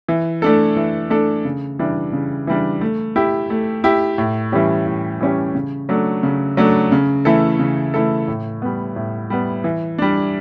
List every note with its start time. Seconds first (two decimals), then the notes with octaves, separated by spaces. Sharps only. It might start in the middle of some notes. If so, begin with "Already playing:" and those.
0.08 E3
0.42 A3 D4 A4
0.77 E3
1.10 A3 D4 A4
1.45 C#3
1.79 E3 G3 D4
2.13 C#3
2.47 E3 G3 D4
2.81 A3
3.16 E4 G4
3.50 A3
3.84 E4 G4
4.18 A2
4.52 E3 G3 C#4 G4
4.87 A2
5.20 E3 G3 C#4 G4
5.55 C#3
5.89 F#3 A3 D4
6.23 C#3
6.57 F#3 A3 D4
6.92 C#3
7.25 E3 A3 E4 A4
7.60 C#3
7.94 E3 A3 E4 A4
8.28 A2
8.62 G3 B3
8.96 A2
9.30 G3 B3
9.64 E3
9.98 G3 D4